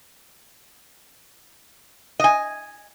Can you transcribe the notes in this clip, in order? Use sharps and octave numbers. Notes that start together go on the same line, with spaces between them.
D#5 G#5